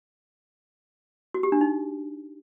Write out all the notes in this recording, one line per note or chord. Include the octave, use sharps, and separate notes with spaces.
F#4
G4
D4
D#4